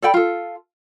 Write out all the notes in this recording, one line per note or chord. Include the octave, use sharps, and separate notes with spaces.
A4 D5 G5 B5
F4 A4